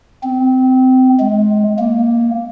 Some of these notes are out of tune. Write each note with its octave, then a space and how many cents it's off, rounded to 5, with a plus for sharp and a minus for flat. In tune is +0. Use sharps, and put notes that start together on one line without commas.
C4 -20
G#3 +20
A#3 +5